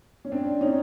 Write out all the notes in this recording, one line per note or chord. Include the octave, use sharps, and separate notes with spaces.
C#4
C4 D4
C#4 D#4